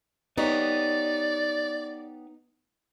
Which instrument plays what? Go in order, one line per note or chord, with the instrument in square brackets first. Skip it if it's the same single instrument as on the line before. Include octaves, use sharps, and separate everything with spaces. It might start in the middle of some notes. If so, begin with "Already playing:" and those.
[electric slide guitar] B3 G4 C#5 [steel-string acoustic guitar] D#4 [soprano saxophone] D5